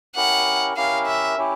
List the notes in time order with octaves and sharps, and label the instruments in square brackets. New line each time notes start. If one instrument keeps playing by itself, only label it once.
[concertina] C#4 E4 G4 A#4 [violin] F#5
[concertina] C#4 E4 G4 A#4 [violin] F5
[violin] E5
[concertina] C#4 E4 G4